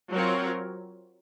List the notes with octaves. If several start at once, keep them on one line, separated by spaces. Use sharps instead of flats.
F#3 C4 F4 A#4 C#5